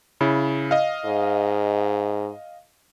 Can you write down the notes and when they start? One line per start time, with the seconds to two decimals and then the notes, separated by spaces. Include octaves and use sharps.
0.21 C#3 E4
0.71 D#5 F5
1.05 G#2